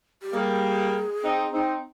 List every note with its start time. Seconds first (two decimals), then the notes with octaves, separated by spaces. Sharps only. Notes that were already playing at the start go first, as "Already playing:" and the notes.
0.22 G4
0.33 G3 A#3 G#4
1.23 C4 D#4
1.53 C4 D#4